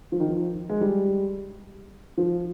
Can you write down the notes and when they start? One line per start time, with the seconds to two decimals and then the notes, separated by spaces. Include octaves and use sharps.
0.12 F3
0.20 D#3
0.29 F3
0.70 G#3
0.81 G3
2.18 F3